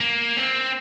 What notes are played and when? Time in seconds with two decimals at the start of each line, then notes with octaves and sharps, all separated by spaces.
0.01 A#3
0.37 C4